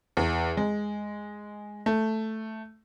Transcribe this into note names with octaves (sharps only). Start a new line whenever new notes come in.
E2
G#3
A3